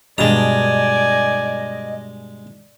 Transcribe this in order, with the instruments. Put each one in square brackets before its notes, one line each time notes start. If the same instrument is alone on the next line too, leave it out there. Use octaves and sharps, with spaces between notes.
[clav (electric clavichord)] G2 B2 D4 [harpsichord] G#3 A#5 [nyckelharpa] D5 G#5 [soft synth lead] D#5